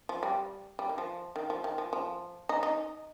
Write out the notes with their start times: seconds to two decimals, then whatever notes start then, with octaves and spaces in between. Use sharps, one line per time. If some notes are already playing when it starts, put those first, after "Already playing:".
0.09 F3
0.23 G3
0.79 G3
0.89 D#3
0.98 F3
1.36 D#3
1.50 F3
1.64 D#3
1.78 F3
1.93 F3
2.49 D#4
2.63 D#4